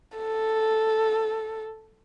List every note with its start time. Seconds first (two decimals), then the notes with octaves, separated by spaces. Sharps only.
0.18 A4